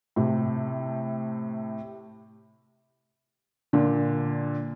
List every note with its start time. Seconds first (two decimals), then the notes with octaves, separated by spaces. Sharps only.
0.16 A2 C3
3.73 A#2 D3